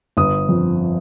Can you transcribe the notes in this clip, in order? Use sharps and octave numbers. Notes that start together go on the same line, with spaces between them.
G1 D#6
F2